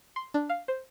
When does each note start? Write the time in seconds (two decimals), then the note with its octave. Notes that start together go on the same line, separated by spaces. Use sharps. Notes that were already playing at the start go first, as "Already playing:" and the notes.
0.16 C6
0.34 D4
0.49 F5
0.68 C5